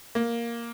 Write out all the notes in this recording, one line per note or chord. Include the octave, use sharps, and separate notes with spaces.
A#3